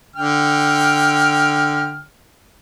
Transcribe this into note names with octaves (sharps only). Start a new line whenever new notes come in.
D3 G5 F6